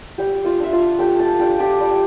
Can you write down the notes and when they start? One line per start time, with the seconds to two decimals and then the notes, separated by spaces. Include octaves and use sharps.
0.18 G3 G4 G5
0.45 F4 F5
0.59 D4 F4 E5
0.73 F4 F5
0.99 A3 G4 G5
1.19 A4 A5
1.39 D4 F4 G4 G5
1.59 G4 G5
1.80 G3